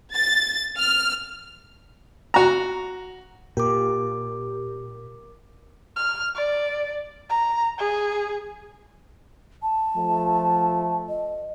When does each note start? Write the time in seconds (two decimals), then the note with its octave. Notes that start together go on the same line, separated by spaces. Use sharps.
0.14 A6
0.78 F6
2.34 F#4 A#5
3.57 A#2 G4 A#4 D6
5.96 F6
6.35 D5
7.30 A#5
7.78 G#4
9.62 A5
9.95 F3 A3
11.09 D#5